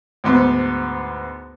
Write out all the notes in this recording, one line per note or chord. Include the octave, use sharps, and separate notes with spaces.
D2 G#2 B3